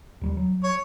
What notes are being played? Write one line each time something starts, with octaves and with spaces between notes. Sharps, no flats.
D#2 F#3 G3
F#3
C#5